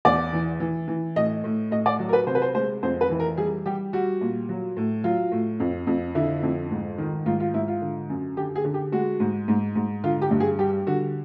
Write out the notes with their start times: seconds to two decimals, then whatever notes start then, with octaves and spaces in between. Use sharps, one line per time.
0.05 E2 D5
0.33 E3
0.60 E3
0.88 E3
1.16 A2 D#5
1.44 A2
1.71 A2 D#5
1.86 D5
1.99 F#3
2.09 A#4
2.13 B4
2.27 C3 C5
2.35 B4
2.42 C5
2.55 G#3 C5
2.83 F2 C5
3.01 B4
3.10 E3
3.20 A#4
3.37 G3 G#4
3.66 G3 G4
3.93 G3 F#4
4.21 A#2
4.49 F#3
4.77 A2
5.04 F#3 F4
5.32 A2
5.60 F2
5.87 F2
6.15 D3 E4
6.43 F2
6.71 G#2
6.98 D#3
7.26 G#2 F4
7.40 F4
7.54 G#2 E4
7.68 F4
7.82 D3
8.09 F#2
8.37 D3 G4
8.56 G#4
8.65 D3
8.74 G4
8.92 G#3 F#4
9.20 G#2
9.48 G#2
9.76 G#2
10.04 D3 F4
10.22 G4
10.31 G2
10.40 G#4
10.59 G3 G4
10.87 D3 F#4